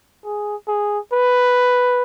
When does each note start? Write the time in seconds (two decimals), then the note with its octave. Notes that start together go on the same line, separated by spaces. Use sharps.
0.24 G#4
0.68 G#4
1.13 B4